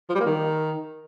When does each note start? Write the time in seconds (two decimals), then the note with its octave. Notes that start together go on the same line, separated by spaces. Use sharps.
0.09 F3
0.15 G3
0.20 A#3
0.26 D#3